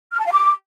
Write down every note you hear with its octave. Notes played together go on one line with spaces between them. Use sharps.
F6
A5
F5
D6